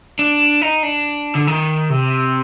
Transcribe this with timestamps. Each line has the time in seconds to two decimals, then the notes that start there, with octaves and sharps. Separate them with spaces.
0.19 D4
0.62 D#4
0.83 D4
1.35 D3
1.47 D#3
1.90 C3